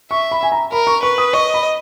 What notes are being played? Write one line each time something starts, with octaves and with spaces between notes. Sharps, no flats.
E5 C#6
B5
G#5
A#5
A#4 B5
C#6
B4 C#6
D#6
D#5 C#6
B5